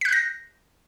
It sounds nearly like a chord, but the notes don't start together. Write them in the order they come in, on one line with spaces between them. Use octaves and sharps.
B6 F#6 G6 A#6